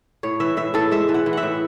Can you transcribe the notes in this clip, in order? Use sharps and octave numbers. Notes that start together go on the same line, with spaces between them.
A2 C#5
E3 E5
A2 E5
A2 A4
G#3 E5
E3
F#5
E3
E5 F#5
A2